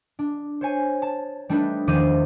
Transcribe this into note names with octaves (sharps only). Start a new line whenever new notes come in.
D4
C5 C#5 G#5
A5
G3 A3 D4 D#4 A4 B4
E2 D#3 F3 C5 D6 D#7